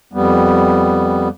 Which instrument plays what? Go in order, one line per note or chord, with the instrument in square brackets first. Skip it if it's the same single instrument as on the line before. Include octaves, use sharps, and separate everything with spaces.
[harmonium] F2 G3 B3